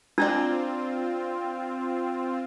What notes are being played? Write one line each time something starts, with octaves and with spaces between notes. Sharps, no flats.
C4 D4 F4 D5 G5 A#5